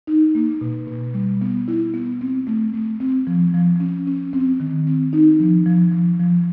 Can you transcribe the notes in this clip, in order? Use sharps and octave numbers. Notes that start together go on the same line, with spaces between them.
D#4
A#3
B2
B2
G3
B3
E4
B3
C4
A3
A3
C4
F3
F3
C#4
C#4
C4
D#3
C4
D#4
F3
F3
F3
F3